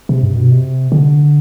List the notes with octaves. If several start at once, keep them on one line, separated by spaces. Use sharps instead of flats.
C3
G2
B2
C3
D3